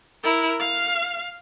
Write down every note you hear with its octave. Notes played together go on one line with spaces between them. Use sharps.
E4 A#4
F5